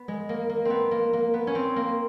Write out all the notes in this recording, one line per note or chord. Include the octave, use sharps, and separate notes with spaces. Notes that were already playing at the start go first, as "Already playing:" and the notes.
Already playing: B3
G#3
A#3
A#3
B3 C4
A#3
A#3
B3
C#4
C4
A#3